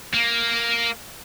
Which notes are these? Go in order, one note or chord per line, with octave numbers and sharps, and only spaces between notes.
A#3